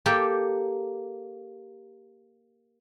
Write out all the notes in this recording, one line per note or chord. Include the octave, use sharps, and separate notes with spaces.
A#3 G4 A4 G5